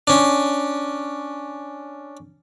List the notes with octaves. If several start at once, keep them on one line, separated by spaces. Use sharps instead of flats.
C#4 D4